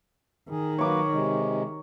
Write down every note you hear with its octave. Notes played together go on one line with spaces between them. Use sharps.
D#3 G#4
F#3 A#3 B4 C#5 D6
C3 G#3